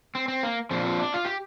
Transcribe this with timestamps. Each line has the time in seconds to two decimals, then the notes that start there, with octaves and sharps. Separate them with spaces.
0.15 C4
0.28 C4
0.43 A#3
0.71 A#2 F3 C4
0.85 C4
0.99 D4
1.14 F4
1.25 G4